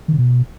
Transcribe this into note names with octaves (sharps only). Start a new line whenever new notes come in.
D#3
D3
B2